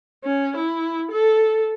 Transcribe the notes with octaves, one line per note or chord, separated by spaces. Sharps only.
C#4
E4
A4